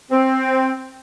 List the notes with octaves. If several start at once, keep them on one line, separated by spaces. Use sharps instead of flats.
C4